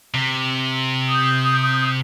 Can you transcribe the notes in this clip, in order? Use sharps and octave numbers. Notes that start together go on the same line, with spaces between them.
C3
D#6 G6